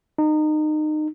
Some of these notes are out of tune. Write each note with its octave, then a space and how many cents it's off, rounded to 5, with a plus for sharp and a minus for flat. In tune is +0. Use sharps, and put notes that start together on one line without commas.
D#4 -25